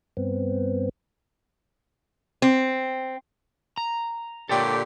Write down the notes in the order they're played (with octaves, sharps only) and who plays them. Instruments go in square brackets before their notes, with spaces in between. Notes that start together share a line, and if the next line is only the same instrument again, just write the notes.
[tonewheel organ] G2 B3 C4
[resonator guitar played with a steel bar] C4
[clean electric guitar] A#5
[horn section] A#2 D3 G4 [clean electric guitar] A4 C#5 G5